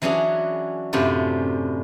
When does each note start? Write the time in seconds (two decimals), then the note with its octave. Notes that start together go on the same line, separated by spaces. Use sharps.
0.02 E3 F#3 C#4 D4 G#4
0.93 F#2 A2 C3 D4 F4